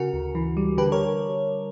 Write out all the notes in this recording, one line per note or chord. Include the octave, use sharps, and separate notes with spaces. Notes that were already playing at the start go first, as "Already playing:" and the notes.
Already playing: C#3 F#4 A#4
D2
E3
G3
D3 G4 B4
A#4 C#5